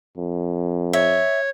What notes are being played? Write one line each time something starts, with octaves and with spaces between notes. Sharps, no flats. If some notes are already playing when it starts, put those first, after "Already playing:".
F2
C#5 E5